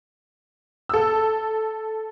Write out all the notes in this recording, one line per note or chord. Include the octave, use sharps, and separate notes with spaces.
A4 E6